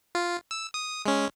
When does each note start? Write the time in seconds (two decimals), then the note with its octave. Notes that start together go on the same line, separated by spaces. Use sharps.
0.15 F4
0.51 E6
0.74 D#6
1.06 G#3 C#4